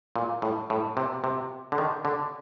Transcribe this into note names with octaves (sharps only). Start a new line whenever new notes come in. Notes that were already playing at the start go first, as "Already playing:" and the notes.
A#2
A2
A2
C3
C3
D3
D#3
D3